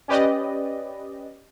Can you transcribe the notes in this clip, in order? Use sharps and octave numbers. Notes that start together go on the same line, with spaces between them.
C#4 G4 B4 D5 D#5